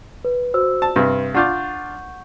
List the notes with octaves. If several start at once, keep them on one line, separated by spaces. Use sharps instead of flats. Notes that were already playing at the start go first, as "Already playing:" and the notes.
B4
F#4 C5 E6
A5
G2 C3 B4
D4 F4 D5 F#5 C#6 G6